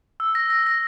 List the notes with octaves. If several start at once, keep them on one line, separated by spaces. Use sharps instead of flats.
E6
A#6
A#6
A#6